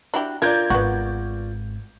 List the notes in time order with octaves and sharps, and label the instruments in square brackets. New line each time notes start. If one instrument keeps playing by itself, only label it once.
[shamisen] D4 E4 G4 [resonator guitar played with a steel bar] F#4
[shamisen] D4 [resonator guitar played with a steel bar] F4 A#4 [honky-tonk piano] D5 G6 G#6
[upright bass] G#1 [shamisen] B3 F#4